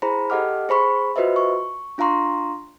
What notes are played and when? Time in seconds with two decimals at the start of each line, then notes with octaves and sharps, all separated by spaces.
0.02 E4 G#4 C5 A#5 B5
0.30 G4 A4 D#5 F#5 D6 F6
0.69 G#4 C5 B5 C#6
1.16 F4 F#4 B4 C5 D#5 E5
1.36 C#6
1.98 D4 F4 F5 A#5 C6 C#6